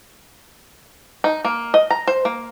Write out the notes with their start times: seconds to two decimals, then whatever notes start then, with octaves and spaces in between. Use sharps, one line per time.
1.24 D#4
1.45 A#3
1.74 D#5
1.90 A#5
2.07 C5
2.25 A#3